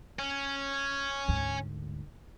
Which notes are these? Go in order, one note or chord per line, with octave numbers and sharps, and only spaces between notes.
C#4
D2 G#2